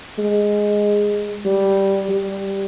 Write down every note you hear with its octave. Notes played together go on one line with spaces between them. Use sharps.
G#3
G3
G3